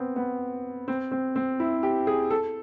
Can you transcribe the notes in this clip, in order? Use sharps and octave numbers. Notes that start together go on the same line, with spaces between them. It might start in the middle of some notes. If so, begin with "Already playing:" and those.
Already playing: B3 C4
B3
C4
C4
C4
E4
G4
G#4
A4